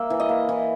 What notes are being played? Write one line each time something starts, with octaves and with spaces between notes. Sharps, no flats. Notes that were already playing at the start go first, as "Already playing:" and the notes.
Already playing: A#3 E5
E3
D#5
A#3
E3